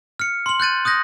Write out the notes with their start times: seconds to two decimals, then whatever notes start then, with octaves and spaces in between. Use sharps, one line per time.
0.19 F6 C#7
0.46 C6 F#7
0.60 F#6 G6 A6 D#7
0.85 D#6 F#6 G6 A#6